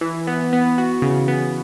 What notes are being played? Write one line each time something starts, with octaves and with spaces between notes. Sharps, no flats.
E3
B3
B3
F#4
C#3
B3